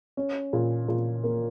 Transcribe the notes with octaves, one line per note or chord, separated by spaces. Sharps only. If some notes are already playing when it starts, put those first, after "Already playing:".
C#4
A#2
A#2
A#3